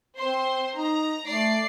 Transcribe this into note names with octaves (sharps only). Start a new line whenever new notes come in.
C4 C5 C6
D#4 A#5
A3 D5 C7